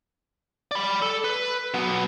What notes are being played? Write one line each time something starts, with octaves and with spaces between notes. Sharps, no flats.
D5 B5
A4
B4
F#3 B3